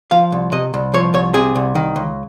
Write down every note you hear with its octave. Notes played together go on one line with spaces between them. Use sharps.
F3 F5
C2
C3 D#5
C2
F3 C#5
C2 C#5
C3 G#4
C2
D#3
C#2